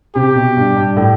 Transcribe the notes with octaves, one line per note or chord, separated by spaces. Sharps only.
C3 G4
B2
G2
G2
A2